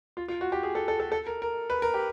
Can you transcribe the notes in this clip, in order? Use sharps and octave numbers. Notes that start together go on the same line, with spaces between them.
F4
F4
F#4
G4
G#4
A4
A4
A4
A4
A#4
A#4
B4
A#4
G4